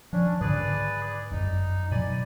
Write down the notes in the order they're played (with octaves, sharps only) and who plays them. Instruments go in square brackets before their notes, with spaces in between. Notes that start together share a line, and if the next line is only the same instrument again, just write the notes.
[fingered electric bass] F3 [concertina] C#4 D4
[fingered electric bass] G#2 D3 D#3 [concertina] G#4 B4 D5
[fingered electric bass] G1 F#2 [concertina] D#4
[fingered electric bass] B2 F#3 [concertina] D5 G#5 B5